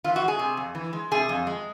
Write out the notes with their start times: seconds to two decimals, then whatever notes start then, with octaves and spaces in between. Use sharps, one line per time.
0.04 E3 F4
0.16 F#4
0.22 G#3
0.28 G#4
0.39 C3
0.57 F2
0.75 E3
0.93 G#3
1.11 C3 G#4
1.29 F2
1.47 G#3